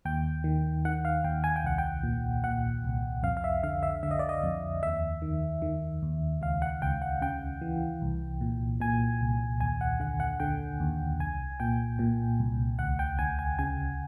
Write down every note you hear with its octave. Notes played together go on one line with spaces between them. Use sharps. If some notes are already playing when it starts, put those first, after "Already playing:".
D#2 G5
D#3
D#3 F#5
F5
D#2 G5
G#5
G5
C2 F#5
G5
A#2
A#2 F#5
C2
F2 F5
F5
E5
D3 F5
E5
D3 E5
D#5
D5
D#5
F2
D#2 E5
D#3
D#3
D#2
C#2 F5
F#5
C#2 G5
F#5
C#3 G5
E3
C2
A#2
A#2 G#5
C2
D#2 G#5
F#5
D3 F#5
F#5
D3 G5
D#2
C2 G#5
A#2 G5
A#2
C2
D2 F#5
G5
D2 G#5
G#5
C#3 G#5